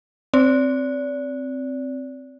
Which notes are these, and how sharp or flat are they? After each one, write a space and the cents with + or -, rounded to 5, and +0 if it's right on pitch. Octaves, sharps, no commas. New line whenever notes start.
C4 +0 D5 -30